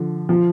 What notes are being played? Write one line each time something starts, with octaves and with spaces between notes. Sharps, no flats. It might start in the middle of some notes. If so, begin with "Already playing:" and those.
Already playing: D3 F3
F3